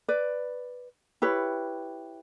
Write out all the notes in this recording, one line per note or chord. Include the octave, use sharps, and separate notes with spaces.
B4 D5
E4 G4 B4 C#5